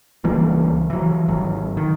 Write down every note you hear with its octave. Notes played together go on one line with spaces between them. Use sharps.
C#2 E3 G3 A#3
E3 F#3
G#1 F#3
D#3